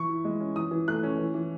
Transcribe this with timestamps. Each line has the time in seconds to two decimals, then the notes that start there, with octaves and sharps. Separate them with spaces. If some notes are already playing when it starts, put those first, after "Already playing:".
Already playing: E3 C#6
0.09 E4
0.25 G#3
0.40 C#4
0.56 E3 D#6
0.71 E3
0.88 A3 F#6
1.03 C#4
1.19 E3
1.34 E3